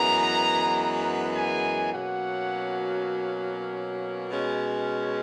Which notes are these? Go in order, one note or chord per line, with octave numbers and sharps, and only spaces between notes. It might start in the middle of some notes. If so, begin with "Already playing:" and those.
Already playing: F#2 E3 G#3 B3 A#5
G#5
B2 F#3 A#3 C#4 F#5
B2 G#3 C#4